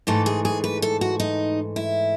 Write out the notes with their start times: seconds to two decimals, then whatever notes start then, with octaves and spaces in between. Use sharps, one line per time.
0.07 G#2 E3 A3 A4
0.26 G#4
0.45 G#4
0.64 B4
0.82 A4
1.01 F#4
1.20 D#4
1.76 E4